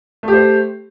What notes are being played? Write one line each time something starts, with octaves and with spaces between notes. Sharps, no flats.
A3 G4 C5